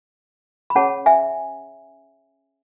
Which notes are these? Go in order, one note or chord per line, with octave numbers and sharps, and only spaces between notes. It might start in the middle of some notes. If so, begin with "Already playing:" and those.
B5
C#4 G#4 C#5 F#5 A5
E5 G#5